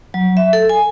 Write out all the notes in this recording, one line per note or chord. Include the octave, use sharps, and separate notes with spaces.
F#3
E5
A4
G#5